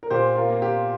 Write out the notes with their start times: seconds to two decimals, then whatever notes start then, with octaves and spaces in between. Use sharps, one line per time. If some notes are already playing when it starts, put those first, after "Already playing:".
0.03 A#4
0.10 A#2 G4 C5
0.36 F4 A#4
0.49 A#3
0.62 G4